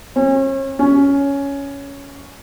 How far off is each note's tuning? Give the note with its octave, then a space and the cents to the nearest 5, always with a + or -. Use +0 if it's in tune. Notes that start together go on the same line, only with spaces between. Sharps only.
C#4 -40
C#4 +10